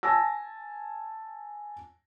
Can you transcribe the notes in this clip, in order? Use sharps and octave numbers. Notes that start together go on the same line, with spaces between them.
G#5 A5 E6 A#6